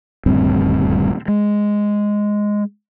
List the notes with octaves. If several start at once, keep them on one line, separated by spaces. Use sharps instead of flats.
D#1 D2 G2 C4
G#3